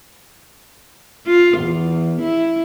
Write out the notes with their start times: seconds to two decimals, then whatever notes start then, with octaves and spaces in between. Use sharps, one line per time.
1.26 F4
1.57 E2
2.21 E4